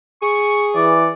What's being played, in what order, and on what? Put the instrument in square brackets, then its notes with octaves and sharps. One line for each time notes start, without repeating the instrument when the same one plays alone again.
[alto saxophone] G#4 [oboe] C#6
[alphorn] E3 [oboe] D5